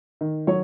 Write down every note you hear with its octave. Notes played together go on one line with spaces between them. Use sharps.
D#3
F#3 C#5